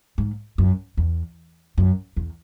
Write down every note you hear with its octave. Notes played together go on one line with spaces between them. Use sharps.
G#2
F#2
E2
F#2
E2